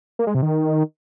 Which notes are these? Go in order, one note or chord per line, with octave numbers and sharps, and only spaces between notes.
A#3
G#3
C3
D#3